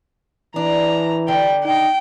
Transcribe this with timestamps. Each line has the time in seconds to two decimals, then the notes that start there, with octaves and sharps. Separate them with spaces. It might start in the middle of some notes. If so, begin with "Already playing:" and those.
0.56 E3 D4 A#5
1.28 D3 D4 G5
1.65 D#4 G5